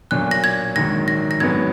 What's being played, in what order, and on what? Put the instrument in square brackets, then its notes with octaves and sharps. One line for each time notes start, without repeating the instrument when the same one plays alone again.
[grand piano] B1 A#2 F#3 D4 [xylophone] F#6
[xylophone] A#6
G#6
[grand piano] A#1 G#2 D#3 F#3 [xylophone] A#6
[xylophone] A#6
A#6
[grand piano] A#1 G#2 F#3 B3 [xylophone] G#6